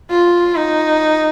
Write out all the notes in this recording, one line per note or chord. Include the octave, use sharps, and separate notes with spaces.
F4
D#4